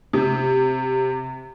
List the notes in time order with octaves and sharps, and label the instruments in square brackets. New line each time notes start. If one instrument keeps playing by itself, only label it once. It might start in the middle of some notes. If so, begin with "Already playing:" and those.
[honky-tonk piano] C3